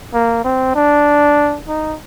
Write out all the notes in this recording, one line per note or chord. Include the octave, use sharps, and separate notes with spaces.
A#3
C4
D4
D#4